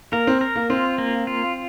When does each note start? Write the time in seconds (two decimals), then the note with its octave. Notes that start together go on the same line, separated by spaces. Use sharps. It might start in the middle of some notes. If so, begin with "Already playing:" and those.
0.12 A#3 A#4
0.27 C4
0.41 A#4
0.56 A#3
0.70 C4 F4
0.98 A#3
1.27 F4